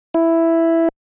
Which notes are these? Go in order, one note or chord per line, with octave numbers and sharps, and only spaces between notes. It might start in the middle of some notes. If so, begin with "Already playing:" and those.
E4